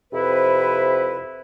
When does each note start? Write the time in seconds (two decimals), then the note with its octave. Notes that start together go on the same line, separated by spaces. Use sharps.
0.12 F2 C3 E4 B4